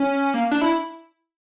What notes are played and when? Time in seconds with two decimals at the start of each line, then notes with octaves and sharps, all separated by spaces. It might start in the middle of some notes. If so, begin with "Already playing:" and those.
Already playing: C#4
0.34 A#3
0.51 D4
0.61 E4